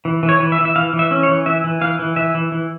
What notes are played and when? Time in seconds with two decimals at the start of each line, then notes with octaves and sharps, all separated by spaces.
0.05 E3
0.23 E3
0.29 C#5
0.40 E3
0.52 E5
0.58 E3
0.65 E5
0.76 E3 F5
0.93 E3
0.99 E5
1.11 C#4
1.23 C#5
1.29 E3
1.46 E3 E5
1.64 E3
1.81 E3 F5
1.99 E3
2.16 E3 E5
2.35 E3
2.52 E3